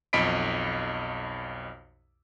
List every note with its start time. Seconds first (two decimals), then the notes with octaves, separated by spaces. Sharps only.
0.13 B1 F2 D#5 B5 B6 D7